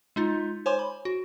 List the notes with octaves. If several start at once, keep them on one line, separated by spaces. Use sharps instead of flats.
G#3 D#4 F4
C5 C#5 G#5 C6 D6
B5
F#4